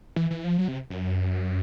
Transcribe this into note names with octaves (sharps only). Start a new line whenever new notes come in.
E3
E3
F3
F#3
C3
F#2